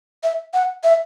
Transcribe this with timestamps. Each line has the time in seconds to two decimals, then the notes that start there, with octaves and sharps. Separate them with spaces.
0.23 E5
0.54 F#5
0.84 E5